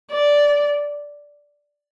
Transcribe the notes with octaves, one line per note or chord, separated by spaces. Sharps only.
D5